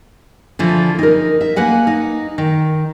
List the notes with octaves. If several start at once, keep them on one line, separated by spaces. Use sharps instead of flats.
D3 E3 F3
D#4 A#4
E5
A#3 B4 F#5 G#5
D#4
D#3